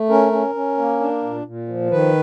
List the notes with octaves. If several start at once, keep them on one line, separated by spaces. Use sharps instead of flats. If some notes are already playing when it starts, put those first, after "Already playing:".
Already playing: A3
C#4 A#4
C#4
C#4
A#3
D4
A#2
A#2
F3
D#3 B4